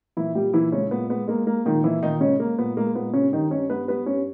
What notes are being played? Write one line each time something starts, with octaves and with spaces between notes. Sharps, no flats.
A#2 E3 E4
A#2 G3 G4
A#2 E3 E4
C#3 G#3 C#4
A#2 B3
G#3 B3
G#3 A#3
G#3 A#3
A#2 D#3 D#4
A#2 E3 E4
A#2 D#3 D#4
C#3 G#3 C#4
G#3 A#3
A#2 B3
G#3 A#3
A#2 B3
G2 C#3 C#4
G2 D#3 D#4
G2 C#4 C#5
G2 B3 B4
G3 B3 B4
G2 C#4 C#5